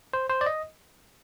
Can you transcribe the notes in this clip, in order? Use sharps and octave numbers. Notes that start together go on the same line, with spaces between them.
C5
C5
D5
D#5